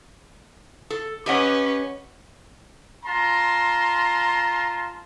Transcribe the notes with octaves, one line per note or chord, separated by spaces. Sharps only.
A4
C#4 G4 B4 D#5 F#5
F4 A5 A#5 C6